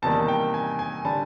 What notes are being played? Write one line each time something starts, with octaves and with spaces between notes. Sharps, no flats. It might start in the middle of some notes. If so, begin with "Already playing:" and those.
E2 C3 D#3 G3 A#3 A5
G5
G#5
G#5
D3 G3 A5